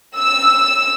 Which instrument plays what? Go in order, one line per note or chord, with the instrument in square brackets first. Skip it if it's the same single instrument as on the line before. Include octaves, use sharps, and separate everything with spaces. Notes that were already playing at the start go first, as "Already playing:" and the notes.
[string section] E6